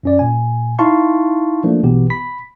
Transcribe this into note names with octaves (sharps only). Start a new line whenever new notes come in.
F#2 C#4 D5
A#2 G#5
D#4 E4 F5 A5 C6 C#6
F3 A3 A#3 D4
A#1 B2 E3 B3 G4
B5 B6